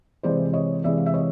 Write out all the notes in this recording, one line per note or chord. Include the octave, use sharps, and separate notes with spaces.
C3 E3 G#3 C5 D5
C#5 D#5
C3 E3 G#3 D5 E5
F5
E5
C#5 D#5